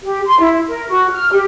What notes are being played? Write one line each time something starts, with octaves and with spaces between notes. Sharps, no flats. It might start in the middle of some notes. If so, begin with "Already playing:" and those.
G4
C6
E4
A#4
F#4
F6
G4